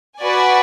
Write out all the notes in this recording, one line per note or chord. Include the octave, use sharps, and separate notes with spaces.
F#4 B4 D5 G#5